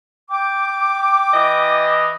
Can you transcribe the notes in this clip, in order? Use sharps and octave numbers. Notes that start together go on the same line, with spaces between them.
G5 D6
E3 D#5